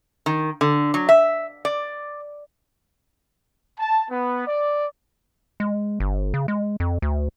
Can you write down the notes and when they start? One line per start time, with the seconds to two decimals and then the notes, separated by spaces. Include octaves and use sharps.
0.26 D#3
0.61 D3
0.94 F#3
1.09 E5
1.65 D5
3.79 A5
4.10 B3
4.47 D5
5.60 G#3
6.00 G1
6.34 C#3
6.48 G#3
6.80 F2
7.02 D2